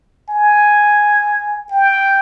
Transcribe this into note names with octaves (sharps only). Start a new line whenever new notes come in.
G#5
G5